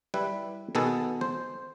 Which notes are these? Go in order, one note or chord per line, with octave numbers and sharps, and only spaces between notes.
G3 E4 B4
B2 D#3 B3 F#4 G#4 A4
C5